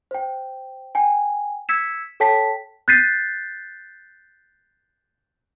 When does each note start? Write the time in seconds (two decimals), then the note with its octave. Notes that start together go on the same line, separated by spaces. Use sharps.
0.11 C5 G5
0.95 G5 G#5
1.69 E6 G#6 B6 C#7 E7
2.20 A4 C#5 G5 A5 B6
2.88 F#6 G6 A6 B6 C7 D#7